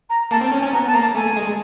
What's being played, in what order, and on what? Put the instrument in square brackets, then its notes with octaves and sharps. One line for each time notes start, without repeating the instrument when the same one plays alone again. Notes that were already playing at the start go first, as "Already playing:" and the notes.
[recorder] A#5
[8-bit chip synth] A#3 [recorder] A5
[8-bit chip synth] C4
[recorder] A5
[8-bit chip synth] C#4
[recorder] G#5
[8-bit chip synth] C#4
[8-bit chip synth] B3 [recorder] A#5
[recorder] A5
[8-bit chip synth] A#3 [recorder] A#5
[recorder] A5
[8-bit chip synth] A3 [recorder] G#5
[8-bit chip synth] G#3